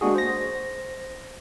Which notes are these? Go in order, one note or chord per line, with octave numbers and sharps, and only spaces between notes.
G#3 A#3 D4 F#4 G#4
C5 A#6